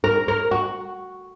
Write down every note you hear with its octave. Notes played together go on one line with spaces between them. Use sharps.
A#4
A#4
F#4